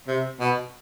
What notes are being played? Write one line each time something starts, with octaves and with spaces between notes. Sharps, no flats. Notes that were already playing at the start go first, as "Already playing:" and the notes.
C3
B2